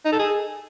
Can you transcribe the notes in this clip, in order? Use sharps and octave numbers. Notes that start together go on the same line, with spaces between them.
D#4
A4
G#4